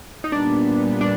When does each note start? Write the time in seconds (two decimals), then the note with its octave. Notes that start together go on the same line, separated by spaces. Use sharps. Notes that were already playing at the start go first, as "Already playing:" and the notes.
0.24 D#4
0.32 A#2 G3 B3 D4
1.01 D4